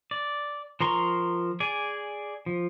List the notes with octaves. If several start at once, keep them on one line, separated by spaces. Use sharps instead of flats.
D5
F3 A#4 A#5 C6 C#6
G#4 D5 G#5
F3